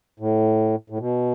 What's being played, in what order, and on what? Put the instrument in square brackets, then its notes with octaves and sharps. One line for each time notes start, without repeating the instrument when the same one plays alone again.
[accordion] A2
A2
B2